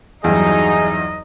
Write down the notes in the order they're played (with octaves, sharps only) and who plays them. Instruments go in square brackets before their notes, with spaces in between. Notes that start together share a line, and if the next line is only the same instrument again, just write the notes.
[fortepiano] E2 G2 [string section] F#3 D#4 [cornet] G#4 [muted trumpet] D#5